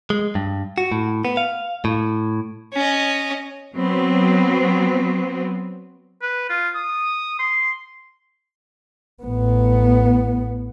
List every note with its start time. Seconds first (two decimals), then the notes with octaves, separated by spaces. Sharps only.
0.10 G#3
0.35 G2
0.78 F#4
0.92 A2
1.25 B3
1.37 F5
1.85 A2
2.73 C#4 D#5
3.75 F#3 B3 C4
6.22 B4
6.50 F4
6.75 D#6
7.39 C6
9.23 A1 B3